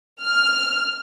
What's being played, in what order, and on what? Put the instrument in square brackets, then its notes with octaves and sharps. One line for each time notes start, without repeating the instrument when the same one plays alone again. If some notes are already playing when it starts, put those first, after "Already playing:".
[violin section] F6